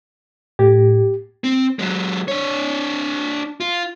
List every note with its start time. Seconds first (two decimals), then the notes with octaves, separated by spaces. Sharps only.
0.59 A2 G4
1.44 C4
1.79 F#3 G#3
2.28 D4 C#5
3.60 F4